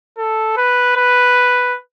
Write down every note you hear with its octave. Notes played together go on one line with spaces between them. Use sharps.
A4
B4
B4